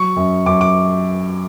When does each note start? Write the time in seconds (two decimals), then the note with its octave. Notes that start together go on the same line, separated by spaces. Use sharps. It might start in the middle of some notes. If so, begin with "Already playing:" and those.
Already playing: F#3 C#6
0.16 F#2
0.46 F#2 D6
0.61 D6